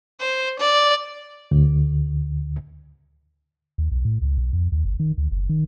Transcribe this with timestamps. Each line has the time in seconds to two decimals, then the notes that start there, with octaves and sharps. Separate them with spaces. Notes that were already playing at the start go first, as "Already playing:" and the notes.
0.20 C5
0.60 D5
1.51 D2
3.78 D#2
3.92 B1
4.05 A2
4.22 C#2
4.38 B1
4.53 F2
4.72 D#2
4.85 G1
5.00 D#3
5.18 D2
5.31 F#1
5.49 D#3